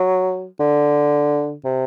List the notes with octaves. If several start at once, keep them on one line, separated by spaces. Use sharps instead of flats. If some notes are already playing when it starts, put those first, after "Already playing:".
Already playing: F#3
D3
C3